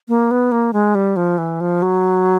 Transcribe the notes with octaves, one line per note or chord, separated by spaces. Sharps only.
A#3
B3
A#3
G#3
G3
F3
E3
F3
F#3